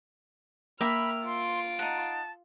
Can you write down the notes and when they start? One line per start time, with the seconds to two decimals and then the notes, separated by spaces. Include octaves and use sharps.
0.81 A#3 E5 G5 B5 F6
1.25 F4 C6 D7
1.79 D#4 F#5 A5